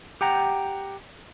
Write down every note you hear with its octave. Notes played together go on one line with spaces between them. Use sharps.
G4 F#5 G5 A#5